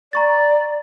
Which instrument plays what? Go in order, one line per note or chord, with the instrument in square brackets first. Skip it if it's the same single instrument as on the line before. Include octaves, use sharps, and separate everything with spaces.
[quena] D5 [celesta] A#5 C#6 A6